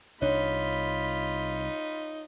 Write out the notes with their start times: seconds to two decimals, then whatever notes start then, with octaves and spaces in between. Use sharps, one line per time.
0.22 C2 D4 D#4 F4 C#5 B5